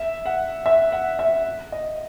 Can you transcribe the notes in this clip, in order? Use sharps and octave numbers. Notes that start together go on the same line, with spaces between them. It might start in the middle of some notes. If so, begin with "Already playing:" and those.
Already playing: E5
F#5
E5
F#5
E5
D#5